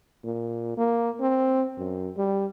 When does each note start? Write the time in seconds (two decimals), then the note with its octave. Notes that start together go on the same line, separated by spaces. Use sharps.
0.24 A#2
0.77 A#3
1.21 C4
1.79 F#2
2.17 G3